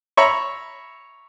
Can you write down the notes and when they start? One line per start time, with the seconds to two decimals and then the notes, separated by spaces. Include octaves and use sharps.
0.17 C#5 E5 A#5 B5 C#6